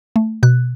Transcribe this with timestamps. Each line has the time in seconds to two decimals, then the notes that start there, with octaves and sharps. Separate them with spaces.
0.16 A3
0.43 B2 F#6